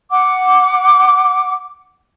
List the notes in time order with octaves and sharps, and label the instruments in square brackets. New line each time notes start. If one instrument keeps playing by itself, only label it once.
[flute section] F#5 D6